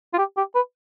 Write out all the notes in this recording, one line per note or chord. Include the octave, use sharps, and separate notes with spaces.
F4
G4
G4
B4